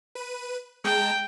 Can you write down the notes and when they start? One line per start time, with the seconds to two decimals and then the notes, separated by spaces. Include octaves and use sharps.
0.15 B4 D#7
0.84 G#3 G5 A5 A#5